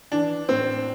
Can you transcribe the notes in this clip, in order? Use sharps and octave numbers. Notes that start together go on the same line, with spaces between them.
E3 D4
A2 C4